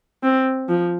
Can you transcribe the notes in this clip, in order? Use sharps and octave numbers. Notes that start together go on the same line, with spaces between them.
C4
F3